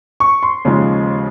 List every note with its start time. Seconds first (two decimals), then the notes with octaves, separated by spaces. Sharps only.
0.20 C#6
0.43 C6
0.64 D#2 C#3 F3 G#3